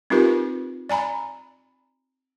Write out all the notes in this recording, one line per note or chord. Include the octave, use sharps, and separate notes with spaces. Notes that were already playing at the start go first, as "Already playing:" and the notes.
C4 D#4 F4 G4 A#4 B4
D5 G#5 A#5 B5